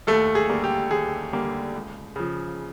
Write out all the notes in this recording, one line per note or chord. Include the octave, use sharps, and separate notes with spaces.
D#2 A3 A4
G#4
D3 G3 A#3
G4
D#2 G#4
D3 G3 A#3
C#2
C#3 F3